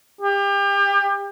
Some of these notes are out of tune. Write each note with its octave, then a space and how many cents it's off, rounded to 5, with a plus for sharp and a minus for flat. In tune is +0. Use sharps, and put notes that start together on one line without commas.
G4 +35